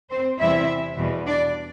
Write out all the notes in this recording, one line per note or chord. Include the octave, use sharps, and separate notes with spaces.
C4 C5
E2 C3 G3 C4 E4 E5
E2 B2 G3
D4 D5